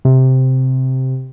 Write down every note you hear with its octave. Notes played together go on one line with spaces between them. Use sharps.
C3